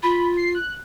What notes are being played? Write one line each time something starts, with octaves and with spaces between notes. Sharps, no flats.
F4 B5
C7
F#6